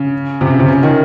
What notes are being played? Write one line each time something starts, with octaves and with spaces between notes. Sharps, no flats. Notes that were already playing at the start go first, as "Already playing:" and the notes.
Already playing: C#3
C3
C#3
C3
C#3
D#3